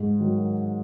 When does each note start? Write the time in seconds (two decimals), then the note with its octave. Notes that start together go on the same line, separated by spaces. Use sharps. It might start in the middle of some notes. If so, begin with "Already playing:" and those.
Already playing: G#2
0.20 D#3 F#3